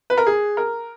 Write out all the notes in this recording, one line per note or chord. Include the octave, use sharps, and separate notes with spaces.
B4
A#4
G#4
A#4